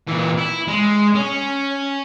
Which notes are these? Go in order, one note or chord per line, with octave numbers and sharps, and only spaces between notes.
A#2 E3
E4
G#3
C#4